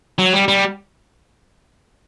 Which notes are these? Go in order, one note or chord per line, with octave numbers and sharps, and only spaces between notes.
F#3
G3
G3